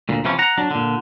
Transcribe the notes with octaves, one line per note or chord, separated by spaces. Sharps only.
D2 A#2
C3 E3 F3 C#4
F#5 A#5
F#3 D4
A#2 D3